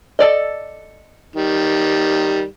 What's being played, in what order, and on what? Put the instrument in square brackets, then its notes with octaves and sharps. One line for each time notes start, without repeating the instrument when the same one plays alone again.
[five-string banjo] A4 D5 D#5
[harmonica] D#3 G3